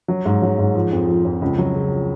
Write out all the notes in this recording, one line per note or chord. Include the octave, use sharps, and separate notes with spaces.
F#3
G#2
F#3
G#2
F3
F2
F3
F2
C#2
F#3
C#3